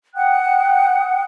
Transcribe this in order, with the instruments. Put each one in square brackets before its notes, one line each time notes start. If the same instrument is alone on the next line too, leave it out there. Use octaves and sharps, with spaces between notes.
[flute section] F#5 G5 D#6 F#6